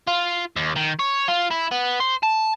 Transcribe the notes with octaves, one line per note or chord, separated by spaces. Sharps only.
F4
D#2
D#3
C#5
F4
E4
B3
C5
A5